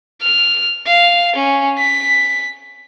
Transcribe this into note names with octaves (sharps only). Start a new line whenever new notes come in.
F6
F5
C#4
B6